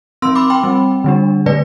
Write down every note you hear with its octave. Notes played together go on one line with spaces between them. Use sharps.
F3 C4 C6 E6
B5 D6
G5 B5
G3 C4
D3 G3 D4
D3 A3 B4 D5